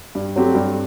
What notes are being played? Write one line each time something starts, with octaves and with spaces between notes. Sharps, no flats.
G2
F#3 A3 C4 G4
G2